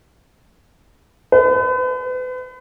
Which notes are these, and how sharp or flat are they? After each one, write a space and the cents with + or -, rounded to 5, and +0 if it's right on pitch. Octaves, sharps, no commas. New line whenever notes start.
B4 +40